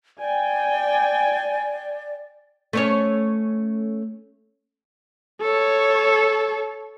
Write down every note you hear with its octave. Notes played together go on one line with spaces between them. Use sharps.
D5 G5 G#5
A3 C#4 C#5
A4 C#5